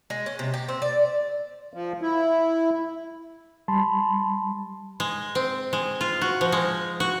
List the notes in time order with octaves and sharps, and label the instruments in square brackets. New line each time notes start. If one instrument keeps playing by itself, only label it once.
[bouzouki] G#3
C#4
C3
G4
C4
D5
[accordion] F3
E4
[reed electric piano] G3 A5 B5 C6
[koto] G#3
C4
G#3
F4
F#4
F3
G#3
F#4